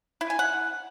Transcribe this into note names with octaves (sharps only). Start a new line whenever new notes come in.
E4
G#5
F#5